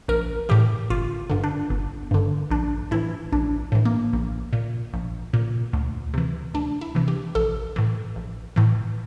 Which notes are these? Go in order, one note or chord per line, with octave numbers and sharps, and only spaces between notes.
A#1 A#4
A2 E3 G4
G1 F4
G2 D3
D4
G1
G2 D3
A#1 D4
A2 E3 E4
A#1 D4
A2 E3
A#3
A#1
A#2
A#1
A#2
D2
C3 E3
D2 D4
E4
C3 E3
G4
A#1 A4
A2 E3
A#1
A2 E3